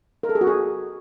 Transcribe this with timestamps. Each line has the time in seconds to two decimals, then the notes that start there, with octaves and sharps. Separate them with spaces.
0.23 A#4
0.29 A4
0.35 G#4
0.41 F#4
0.47 G#4